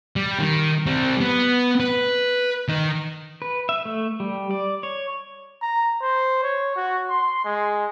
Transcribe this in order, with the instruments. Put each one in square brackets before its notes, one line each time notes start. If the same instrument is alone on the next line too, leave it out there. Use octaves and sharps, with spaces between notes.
[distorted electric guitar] G3
D#3
G3 C4
B3
B4
D#3 D#5
[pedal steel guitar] B4
E5
A3
G3
D5
C#5
[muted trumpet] A#5
C5
C#5
F#4
C6
G#3